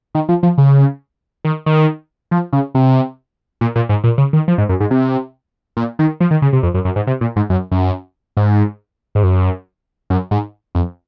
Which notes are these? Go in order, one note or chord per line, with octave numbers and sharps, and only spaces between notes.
D#3
F3
F3
C#3
D#3
D#3
F3
C#3
C3
A#2
A#2
G#2
A#2
C#3
D#3
F3
G#2
F#2
G#2
C3
A#2
D#3
F3
D#3
C#3
C3
F2
F#2
F#2
G#2
C3
A#2
G#2
F#2
F#2
G#2
G#2
F#2
F#2
G#2
F2